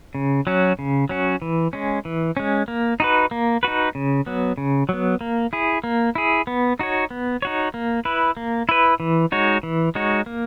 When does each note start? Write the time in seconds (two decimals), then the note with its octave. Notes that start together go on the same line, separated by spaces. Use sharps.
0.15 C#3
0.47 F#3 C#4 F#4
0.79 C#3
1.09 F#3 C#4 F#4
1.42 E3
1.73 G#3 C#4
2.05 E3
2.37 G#3 C#4
2.68 A#3
3.00 D#4 F#4 B4
3.31 A#3
3.63 D#4 F#4 B4
3.95 C#3
4.26 F#3 B3
4.58 C#3
4.89 F#3 B3
5.21 A#3
5.53 E4 G#4
5.84 A#3
6.15 E4 G#4
6.47 B3
6.79 D#4 F#4 C#5
7.11 B3
7.42 D#4 F#4 C#5
7.74 A#3
8.05 E4 B4
8.37 A#3
8.69 E4 B4
9.00 E3
9.32 G#3 D#4 F#4 C#5
9.63 E3
9.95 G#3 D#4 F#4 C#5
10.26 A#3